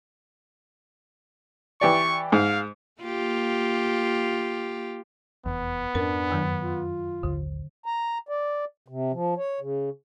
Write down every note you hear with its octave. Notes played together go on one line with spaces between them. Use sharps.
E3 G4 D5 C#6
G#2 F5
A#3 F4 G4
F1 E2 B3
F2 G#2 C#4 D4 A#4
F#2 D#3 F#3
F4
A1 D#2 D3
A#5
D5
C3
F3
C#5
C#3